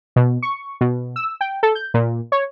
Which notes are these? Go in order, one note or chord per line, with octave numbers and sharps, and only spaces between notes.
B2
C#6
B2
E6
G5
A4
G6
A#2
C#5